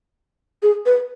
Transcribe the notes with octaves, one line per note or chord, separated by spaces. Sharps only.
G#4
B4